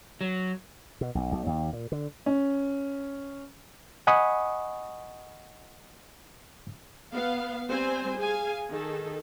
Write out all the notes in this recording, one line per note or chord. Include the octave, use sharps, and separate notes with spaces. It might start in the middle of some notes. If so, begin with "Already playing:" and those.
F#3
B2
B1
B1
D#2
A#2
D3
C#4
D#5 F#5 G#5 B5 C#6 D#6
B3 F5
G3 C4 C5 G#5
G#4 F5 G#5
D#3 G#4 A4